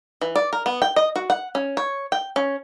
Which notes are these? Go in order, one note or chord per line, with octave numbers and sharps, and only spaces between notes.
E3
D5
A#4
B3
G5
D#5
F#4
F#5
C#4
C#5
G5
C#4